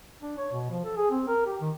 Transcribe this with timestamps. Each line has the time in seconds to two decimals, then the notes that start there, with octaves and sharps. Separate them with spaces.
0.22 D4
0.38 C#5
0.52 B2
0.70 F3
0.84 A4
0.97 G#4
1.11 C4
1.28 A#4
1.46 G4
1.61 D#3